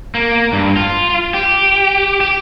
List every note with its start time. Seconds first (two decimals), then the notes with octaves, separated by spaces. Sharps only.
0.15 A#3
0.53 G2
0.76 F4
1.34 G4
2.21 G4